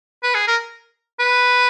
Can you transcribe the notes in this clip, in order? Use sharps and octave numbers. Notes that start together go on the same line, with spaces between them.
B4
G#4
A#4
B4